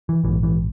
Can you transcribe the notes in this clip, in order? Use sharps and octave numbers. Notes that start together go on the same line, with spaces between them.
E3
A#1 G#2 E3
E3